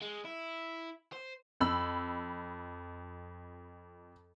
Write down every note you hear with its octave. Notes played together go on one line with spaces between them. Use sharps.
G#3
E4
C5
F2 B5 E6